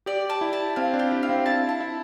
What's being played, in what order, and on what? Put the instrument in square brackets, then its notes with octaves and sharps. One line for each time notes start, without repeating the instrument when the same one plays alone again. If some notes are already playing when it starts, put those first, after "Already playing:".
[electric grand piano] G4 [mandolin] D5
[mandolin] A5
[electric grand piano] E4
[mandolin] A5
[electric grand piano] C4 [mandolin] F5
[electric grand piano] D4
[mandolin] G4
[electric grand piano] E4
[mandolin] F5
[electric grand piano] C4
[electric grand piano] E4 [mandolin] A5
[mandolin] A5
[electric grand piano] E4